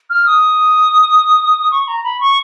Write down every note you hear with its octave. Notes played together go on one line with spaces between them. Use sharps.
F6
D#6
C#6
A#5
B5
C#6